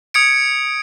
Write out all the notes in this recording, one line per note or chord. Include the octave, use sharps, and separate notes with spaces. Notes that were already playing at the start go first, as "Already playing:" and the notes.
D#6 G#6 C#7 D7